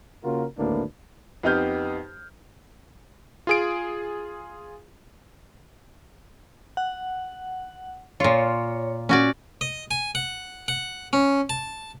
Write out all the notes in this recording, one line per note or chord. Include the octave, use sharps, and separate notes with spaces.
C#3 A#3 F4 F#4 A#4
G#1 D2 A2 A#3 D4 B4
F2 B3 D#4 G4 F6 G6
F4 G#4 D7
F#5
A#2 F4 C#5
A#2 C#4 F#4 D5
D#5
G#5
F#5
F#5
C#4
A5